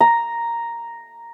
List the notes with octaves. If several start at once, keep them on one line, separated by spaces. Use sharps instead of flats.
A#5